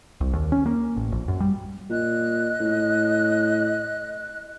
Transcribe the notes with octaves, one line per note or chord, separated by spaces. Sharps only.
C2
D#2
C#4
A#3
A1
A#1
F#2
G3
A#2 D#5 F#6
A2